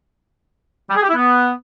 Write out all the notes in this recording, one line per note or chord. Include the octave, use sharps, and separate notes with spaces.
G3
G#4
G4
E4
B3